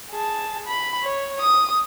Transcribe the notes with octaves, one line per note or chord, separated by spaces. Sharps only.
G#4 A5
B5
C#5
D#6